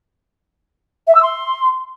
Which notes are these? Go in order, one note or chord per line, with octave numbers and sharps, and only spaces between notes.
E5
E6
C6